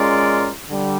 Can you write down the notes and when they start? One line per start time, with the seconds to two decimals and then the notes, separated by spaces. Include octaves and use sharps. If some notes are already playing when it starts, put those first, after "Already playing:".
Already playing: G#3 C#4 F4 A#4 D5
0.69 D3 G3